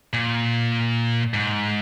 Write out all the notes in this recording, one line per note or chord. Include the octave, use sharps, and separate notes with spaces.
A#2
G#2